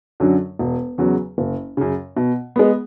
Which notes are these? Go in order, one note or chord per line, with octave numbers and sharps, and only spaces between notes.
F#2 D3 F#3
E1
E2 C#3 F#3
F#1
F#2 C#3
B2
G#3 B3